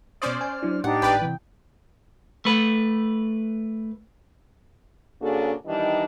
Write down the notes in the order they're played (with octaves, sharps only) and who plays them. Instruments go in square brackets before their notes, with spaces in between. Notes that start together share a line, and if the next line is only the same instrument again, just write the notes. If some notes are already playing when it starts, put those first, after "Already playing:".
[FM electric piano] B2 D#6 [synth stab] C#4 C5 D5 [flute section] F6
[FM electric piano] G#5
F#3 D4 E4
[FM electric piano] A2 [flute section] D4 D#4 G4 [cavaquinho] F#5
[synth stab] G#1 B4 D5 [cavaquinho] G5
[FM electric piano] C3 E3
[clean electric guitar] A3 B4
[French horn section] C#3 A#3 D4 F#4 G#4 A4
D#3 E3 G3 D4 D#4